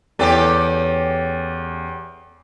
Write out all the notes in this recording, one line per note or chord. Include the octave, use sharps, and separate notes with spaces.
E2 C#4 G4 A4